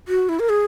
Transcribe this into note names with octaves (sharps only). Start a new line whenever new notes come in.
F#4
E4
A#4
G#4